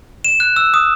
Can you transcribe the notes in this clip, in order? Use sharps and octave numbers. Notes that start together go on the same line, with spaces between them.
E7
F#6
E6
D#6